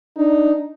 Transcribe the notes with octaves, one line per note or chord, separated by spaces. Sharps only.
D4 D#4